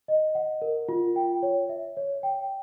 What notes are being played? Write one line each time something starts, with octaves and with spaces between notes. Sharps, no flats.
D#5
F#5
A#4
F4
G5
C#5
E5
C#5
G5